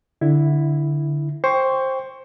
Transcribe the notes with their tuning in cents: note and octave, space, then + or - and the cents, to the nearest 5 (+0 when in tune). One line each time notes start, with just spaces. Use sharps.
D3 +0 E4 +0
C5 +15 G5 +10 C#6 +20